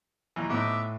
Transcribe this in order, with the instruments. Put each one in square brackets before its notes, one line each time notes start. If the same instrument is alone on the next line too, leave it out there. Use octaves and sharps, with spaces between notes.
[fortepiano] D#2 A#2 E3
[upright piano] A2 [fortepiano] B3 D#4 [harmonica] E5 D6